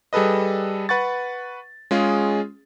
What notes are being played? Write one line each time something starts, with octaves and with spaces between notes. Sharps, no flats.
G3 G#4 A4 B4 D#5
B4 F#5 C#6 A6
G#3 C#4 F4 G#4